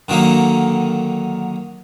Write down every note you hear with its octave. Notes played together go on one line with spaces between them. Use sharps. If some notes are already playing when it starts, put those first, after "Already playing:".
D3 D#3 F#3 A#3